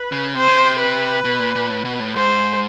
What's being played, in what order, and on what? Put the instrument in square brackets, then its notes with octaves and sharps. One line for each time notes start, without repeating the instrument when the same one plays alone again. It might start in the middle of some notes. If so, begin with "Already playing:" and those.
Already playing: [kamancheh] B4
[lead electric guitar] C#3
[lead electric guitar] C3 [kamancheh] C5
[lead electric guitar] C#3
C3
[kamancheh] B4
[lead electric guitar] B2
A#2
A#2
A2
B2
A2
[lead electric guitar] G#2 [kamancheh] C5